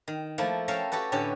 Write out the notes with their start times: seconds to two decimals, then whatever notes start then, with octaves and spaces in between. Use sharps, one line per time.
0.08 D#3
0.38 F3 A3 A#3 E4
0.68 C#4 A4 A#4 E5 F5 G5
0.92 F#4 G4 A4 B4
1.12 A2 D3 C#4 G4 B4